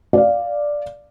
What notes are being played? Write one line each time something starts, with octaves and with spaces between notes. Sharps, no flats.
D5 F5